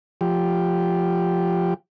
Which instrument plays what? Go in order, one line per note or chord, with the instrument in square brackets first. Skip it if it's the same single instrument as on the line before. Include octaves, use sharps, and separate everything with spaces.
[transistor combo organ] F3 G4